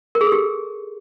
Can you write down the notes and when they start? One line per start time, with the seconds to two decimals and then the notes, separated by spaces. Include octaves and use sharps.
0.15 A#4
0.21 G#4
0.26 A4
0.32 G4